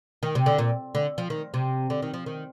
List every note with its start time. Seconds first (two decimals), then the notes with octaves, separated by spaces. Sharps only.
0.23 D#3
0.35 C3
0.46 D3
0.59 A#2
0.95 D3
1.18 F3
1.30 D#3
1.54 C3
1.90 D3
2.02 D#3
2.14 F3
2.26 D#3